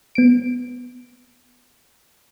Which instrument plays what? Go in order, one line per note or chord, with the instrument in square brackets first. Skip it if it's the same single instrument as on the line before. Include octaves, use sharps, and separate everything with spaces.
[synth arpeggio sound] B3 D7